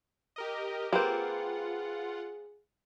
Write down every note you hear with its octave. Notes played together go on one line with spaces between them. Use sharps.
G4 A#4 D#5
A#3 C4 F4 G4 G#4 B4 F#5